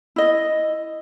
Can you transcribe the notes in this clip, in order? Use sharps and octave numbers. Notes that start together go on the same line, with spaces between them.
E4 D#5